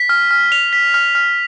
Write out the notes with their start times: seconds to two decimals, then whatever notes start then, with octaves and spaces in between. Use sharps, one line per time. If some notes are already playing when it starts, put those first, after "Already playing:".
Already playing: B6
0.09 F6
0.31 F6
0.52 F7
0.73 B6
0.94 F6
1.15 F6